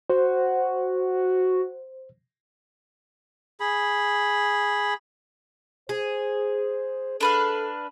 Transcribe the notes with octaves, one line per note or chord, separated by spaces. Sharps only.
F#4 C5
G#4 B5
G#4 C5
D4 A4 B4 F5